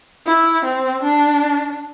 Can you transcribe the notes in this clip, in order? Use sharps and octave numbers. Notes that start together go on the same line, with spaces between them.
E4
C4
D4